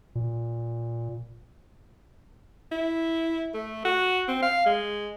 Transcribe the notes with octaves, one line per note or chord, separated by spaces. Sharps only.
A#2
E4
A3
F#4
C4
F5
G#3